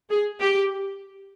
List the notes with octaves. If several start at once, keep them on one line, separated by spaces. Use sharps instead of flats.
G#4
G4